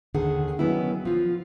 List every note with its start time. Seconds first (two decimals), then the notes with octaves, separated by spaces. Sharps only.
0.14 D#2 D3 D#3 G#4 F#5
0.59 D#3 F#3 B3 C#4 E4
1.05 F3 F4